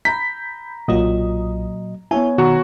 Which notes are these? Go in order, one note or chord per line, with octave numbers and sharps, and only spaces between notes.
A#5 B5 G6 B6
B1 A#2 F#3 F4 D#5 D#6
B3 E4 C#5 E5 G#5
B2 D#3 F#4 A#5